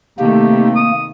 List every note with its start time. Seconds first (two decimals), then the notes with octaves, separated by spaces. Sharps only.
0.19 C3 D#3 A3 A#3 G4
0.76 D#6